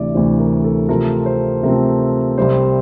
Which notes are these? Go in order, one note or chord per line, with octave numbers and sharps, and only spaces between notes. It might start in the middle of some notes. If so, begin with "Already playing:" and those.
Already playing: D2 C3 E3 D5 E5
D2 C3 E3 C5
A#4
A4
C3 F3 A3 C4 A#4
C5
C3 F3 A3 C4 A#4
C2 C3 G3 C4 C5